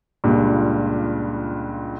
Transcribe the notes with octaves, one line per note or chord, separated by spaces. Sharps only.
C#2 G2 A#2